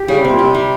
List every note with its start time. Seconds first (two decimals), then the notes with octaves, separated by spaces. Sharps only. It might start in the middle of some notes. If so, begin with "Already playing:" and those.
Already playing: G4
0.08 C#3 G3
0.20 C3
0.24 C4
0.32 A#2
0.39 C3 G4
0.54 G3